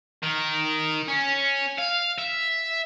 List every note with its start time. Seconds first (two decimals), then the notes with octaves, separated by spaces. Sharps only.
0.23 D#3
1.08 C#4
1.78 F5
2.18 E5